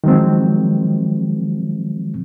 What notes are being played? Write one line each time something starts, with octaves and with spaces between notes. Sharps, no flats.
D#3 F3 F#3 G#3 C4